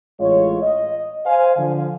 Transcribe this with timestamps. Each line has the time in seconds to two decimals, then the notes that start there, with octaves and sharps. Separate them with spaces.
0.20 A1 G#3 F4 C#5
0.62 D#5
1.26 C5 F5 G#5
1.57 D3 F3